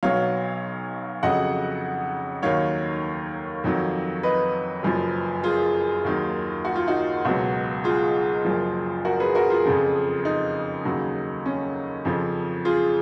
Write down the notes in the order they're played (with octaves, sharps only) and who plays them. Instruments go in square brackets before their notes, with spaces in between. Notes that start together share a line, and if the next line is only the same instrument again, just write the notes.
[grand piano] B1 B2 F#3 C#5 F5
F2 C#3 F#3 D#5 F#5
D#2 D#3 F#3 C#5 F5
F2 D#3 F#3
B4 D#5
F#1 F#2 F3
F4 G#4
D#2 D#3 F#3
F#4
F4
D#4 F#4
C#2 B2 F#3
F4 G#4
F#1 F#2 F3
F#4 A#4
G#4 B4
F#4 A#4
F4 G#4
F2 C#3 F3
D#4
D#2 C#3 F#3
C#4
F2 C#3 F3
F4 G#4